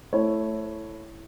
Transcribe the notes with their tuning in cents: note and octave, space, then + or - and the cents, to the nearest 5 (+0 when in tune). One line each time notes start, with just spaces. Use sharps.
A3 +0 E4 +0 C#5 +0